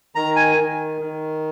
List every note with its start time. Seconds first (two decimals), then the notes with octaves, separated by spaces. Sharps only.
0.15 D#3 A#5
0.36 G#5
0.57 D#3
1.01 D#3